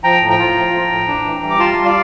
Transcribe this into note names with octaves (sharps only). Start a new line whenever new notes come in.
F3 G5 A#5
A2
G5 A#5
F4
F3
F3
A2
D4
E3
G3
D6
F4 A5 C6
G3
D5 F5